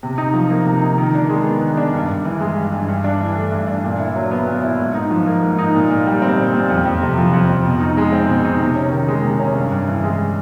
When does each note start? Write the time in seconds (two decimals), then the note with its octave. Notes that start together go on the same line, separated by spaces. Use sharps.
0.03 C3
0.18 D#4
0.34 F3
0.50 A#3
0.66 C3
0.82 D#4
0.98 D#3
1.14 D4
1.29 G#3
1.46 B3
1.61 D#3
1.77 D4
1.94 G2
2.09 G2
2.25 E3
2.40 G#3
2.56 G2
2.73 G2
2.88 G2
3.04 D4
3.20 E3
3.36 A3
3.52 G2
3.67 D4
3.84 A#2
3.99 E4
4.16 F#3
4.31 B3
4.47 A#2
4.63 E4
4.79 G#2
4.95 D#4
5.11 F3
5.26 A#3
5.42 G#2
5.58 D#4
5.74 A#2
5.90 A#2
6.07 G3
6.22 C4
6.38 A#2
6.54 A#2
6.70 F2
6.85 F2
7.01 C3
7.18 F3
7.33 F2
7.49 F2
7.65 B2
7.80 D#4
7.97 G#3
8.12 C4
8.29 B2
8.45 D#4
8.60 C3
8.76 C#4
8.91 D#3
9.08 G#3
9.24 C3
9.39 C#4
9.55 G2
9.72 G2
9.88 E3
10.03 G#3